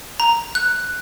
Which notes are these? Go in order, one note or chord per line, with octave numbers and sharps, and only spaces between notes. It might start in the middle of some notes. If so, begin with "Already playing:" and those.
A#5
F#6